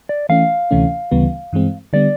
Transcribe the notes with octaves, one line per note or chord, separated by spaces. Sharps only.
D5
E3 A3 C#4 F5
D2 C3 E3 A3 C#4
D2 C#3 E3 G3 B3
G2 E3 G#3 C4
D3 G3 B3 D5